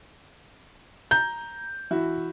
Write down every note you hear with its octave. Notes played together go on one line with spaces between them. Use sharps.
A#5 G6
E3 E4 F#4